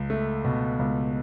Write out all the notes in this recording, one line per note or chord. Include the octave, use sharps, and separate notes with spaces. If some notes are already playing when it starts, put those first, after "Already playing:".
Already playing: C#2
A3
B2
C#2